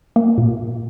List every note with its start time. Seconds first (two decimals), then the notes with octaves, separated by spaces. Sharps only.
0.16 A#3
0.38 A#2